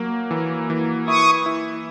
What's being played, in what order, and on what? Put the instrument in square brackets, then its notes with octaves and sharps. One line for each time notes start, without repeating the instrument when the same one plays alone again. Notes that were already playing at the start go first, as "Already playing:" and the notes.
Already playing: [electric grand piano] F#3 A#3
E3
E3
[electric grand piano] E4 [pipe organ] C#6 D#6
[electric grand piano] E4